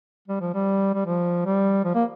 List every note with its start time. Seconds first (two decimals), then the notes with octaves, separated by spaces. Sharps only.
0.28 G3
0.41 F3
0.54 G3
0.94 G3
1.06 F3
1.45 G3
1.85 F3
1.95 A#3